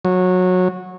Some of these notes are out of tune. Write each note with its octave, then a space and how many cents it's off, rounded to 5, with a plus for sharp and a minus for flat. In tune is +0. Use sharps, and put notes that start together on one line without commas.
F#3 -20